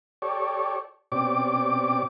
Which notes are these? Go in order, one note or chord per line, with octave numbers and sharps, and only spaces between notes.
G4 A4 C#5 D5
B2 C4 C#4 G4 D5 D6